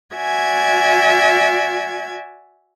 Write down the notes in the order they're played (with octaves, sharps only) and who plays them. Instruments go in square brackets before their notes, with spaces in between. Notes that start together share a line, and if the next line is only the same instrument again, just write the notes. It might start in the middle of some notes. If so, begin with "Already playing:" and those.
[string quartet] F#4 D5 E5 G#5 G#6